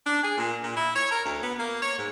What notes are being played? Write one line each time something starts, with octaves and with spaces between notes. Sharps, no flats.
D4
G#4
A#2
A#2
E4
C#5
A#4
D2
B3
A#3
C#5
G#2